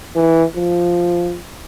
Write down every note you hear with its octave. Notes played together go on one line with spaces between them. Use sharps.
E3
F3